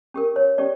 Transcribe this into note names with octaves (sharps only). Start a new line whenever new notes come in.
C#4 G4 A#4
C#5
C#4 G4 D5